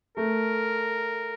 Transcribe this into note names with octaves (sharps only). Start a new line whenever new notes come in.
A3 A#4